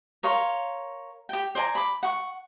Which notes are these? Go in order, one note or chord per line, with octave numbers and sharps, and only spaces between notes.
A#4 C#5 F5 C6
G4 G5
C5 D5 G#5 A#5
B5 D6
F#5 C#6